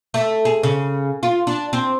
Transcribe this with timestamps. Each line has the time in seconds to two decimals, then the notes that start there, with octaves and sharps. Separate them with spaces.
0.14 A3
0.45 G#4
0.63 C#3
1.23 F4
1.47 D4
1.73 C4